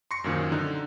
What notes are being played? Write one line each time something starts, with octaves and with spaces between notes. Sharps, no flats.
C6 C#6 A#6 C#7
F#2 A#2 D#3 F3
D3 D#4